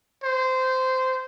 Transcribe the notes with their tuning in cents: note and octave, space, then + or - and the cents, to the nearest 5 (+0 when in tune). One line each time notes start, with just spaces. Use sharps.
C5 -15